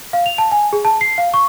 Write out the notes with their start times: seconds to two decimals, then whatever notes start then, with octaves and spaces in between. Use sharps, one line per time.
0.13 F5
0.26 F7
0.38 A5
0.52 G#5
0.73 G#4
0.85 A5
1.01 C7
1.18 F5
1.34 C#6